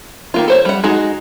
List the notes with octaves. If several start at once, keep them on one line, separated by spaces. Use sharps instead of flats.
D#3 A#3 F4
A4 C5 C#5
G3 F#5
G#3 D#4 F#4